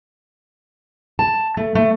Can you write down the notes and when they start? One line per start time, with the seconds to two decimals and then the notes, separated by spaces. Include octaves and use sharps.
1.19 A5
1.57 A3
1.75 A3